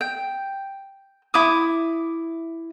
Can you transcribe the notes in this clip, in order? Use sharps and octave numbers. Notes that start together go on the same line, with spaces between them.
G5
E4 D6 D#6